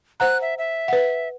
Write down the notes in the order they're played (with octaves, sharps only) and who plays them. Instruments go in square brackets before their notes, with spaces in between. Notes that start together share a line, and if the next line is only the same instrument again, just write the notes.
[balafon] C5 F#5 A#5 [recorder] F#6
[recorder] E5
E5
[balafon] B4 F#5